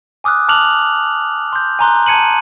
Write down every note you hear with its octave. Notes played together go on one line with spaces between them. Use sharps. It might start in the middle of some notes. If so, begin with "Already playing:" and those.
G#5 D6 D#6 F6 F#6
A5 D6 F6 F#6 F7 F#7
C6 G6
G#5 A#5 C6 F#6
A5 G#6 C#7 D#7 F#7